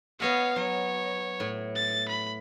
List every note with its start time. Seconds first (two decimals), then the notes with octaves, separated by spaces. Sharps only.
0.20 B3 C#5 D#5 F5 F#5
0.56 F#3 C#5
1.40 A2
1.75 A6
2.08 B5